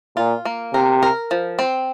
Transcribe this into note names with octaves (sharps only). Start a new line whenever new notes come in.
A#2 F4
A#3
C3 A#4
A#4
F3
C4